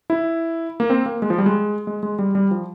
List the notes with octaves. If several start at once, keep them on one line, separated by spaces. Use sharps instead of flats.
E4
A#3
C4
A#3
G#3
F3
G3
G#3
G#3
G#3
G3
G3
F3